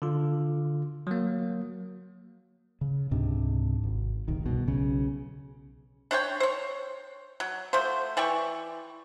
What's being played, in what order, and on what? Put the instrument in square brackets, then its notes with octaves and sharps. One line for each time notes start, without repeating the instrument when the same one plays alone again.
[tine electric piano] D3 F4
F#3 A#3
[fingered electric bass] C#3
C#2 G#2 C3 D4
G#1
F1 A#1 D#3
C2 B2
B1 C#3
[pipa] D4 C5 C#5 G5
C5 C#5
F#3
F3 A3 F#4 C5
E3 D5 G5 C#6